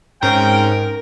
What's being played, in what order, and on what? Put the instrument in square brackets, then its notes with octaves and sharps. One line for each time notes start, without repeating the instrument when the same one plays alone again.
[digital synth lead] G#2 [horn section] C4 C#4 [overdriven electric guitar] A#4 [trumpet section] G5